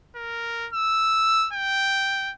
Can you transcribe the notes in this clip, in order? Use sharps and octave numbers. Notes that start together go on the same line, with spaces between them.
A#4
E6
G5